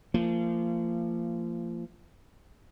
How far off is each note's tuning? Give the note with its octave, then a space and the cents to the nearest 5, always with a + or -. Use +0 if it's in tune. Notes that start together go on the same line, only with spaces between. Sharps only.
F3 -30 A#3 -40